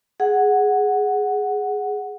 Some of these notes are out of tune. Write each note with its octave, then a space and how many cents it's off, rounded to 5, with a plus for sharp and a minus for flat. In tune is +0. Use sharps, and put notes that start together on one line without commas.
G#4 +0 F#5 +0